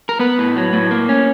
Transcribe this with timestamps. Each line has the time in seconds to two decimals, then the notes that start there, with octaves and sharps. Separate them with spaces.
0.09 A#4
0.20 B3 B4
0.38 A2
0.56 F#3
0.73 A2
0.91 A#3
1.09 C#4